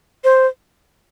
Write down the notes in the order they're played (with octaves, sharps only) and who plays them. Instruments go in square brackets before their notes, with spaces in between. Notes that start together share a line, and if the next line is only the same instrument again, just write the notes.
[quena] C5